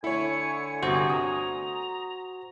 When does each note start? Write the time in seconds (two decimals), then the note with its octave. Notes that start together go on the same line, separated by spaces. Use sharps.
0.04 D3 A3 E4 C#5 G#5 C#7
0.83 G1 C3 F#4 C5 A#6
1.09 A#5 D#6